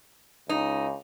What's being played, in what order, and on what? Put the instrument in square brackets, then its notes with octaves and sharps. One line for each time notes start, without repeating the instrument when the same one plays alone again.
[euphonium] C#2 [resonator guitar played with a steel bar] D#4